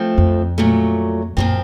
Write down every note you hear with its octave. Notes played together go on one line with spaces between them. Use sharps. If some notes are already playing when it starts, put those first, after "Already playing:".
Already playing: F3 A3 C4
F2
A#2 F#3 A3
F#2 A#2 F3 C4